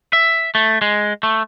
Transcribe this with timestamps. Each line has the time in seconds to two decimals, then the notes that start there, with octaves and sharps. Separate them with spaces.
0.13 E5
0.55 A3
0.82 G#3
1.23 A3